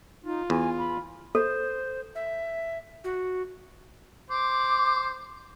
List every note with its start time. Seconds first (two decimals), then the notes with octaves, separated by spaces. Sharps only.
0.24 D#4 F4
0.50 E2 G#5
0.79 B5
1.35 A4 C5
2.15 E5
3.04 F#4
4.30 C5 D6